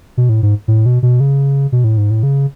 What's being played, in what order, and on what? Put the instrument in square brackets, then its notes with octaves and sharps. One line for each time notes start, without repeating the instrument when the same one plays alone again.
[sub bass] B2
A2
G#2
A2
B2
B2
C#3
B2
A2
G#2
A2
C#3